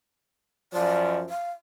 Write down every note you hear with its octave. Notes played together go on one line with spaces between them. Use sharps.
F#2 F3 D5
F5